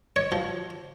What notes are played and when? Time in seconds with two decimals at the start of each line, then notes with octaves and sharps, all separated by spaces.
0.16 C#5
0.32 F3